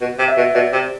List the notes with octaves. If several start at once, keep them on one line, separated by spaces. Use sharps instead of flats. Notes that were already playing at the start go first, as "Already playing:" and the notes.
B2
C3
E5
B2
B2 D5
C3